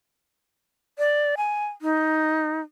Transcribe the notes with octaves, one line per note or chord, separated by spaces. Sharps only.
D5
G#5
D#4